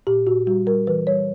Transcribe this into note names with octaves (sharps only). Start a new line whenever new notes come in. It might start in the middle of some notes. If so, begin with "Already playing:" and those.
A#2 G4
A#2 F#4
G3 F#4
G3 A#4
E3 B4
G3 C#5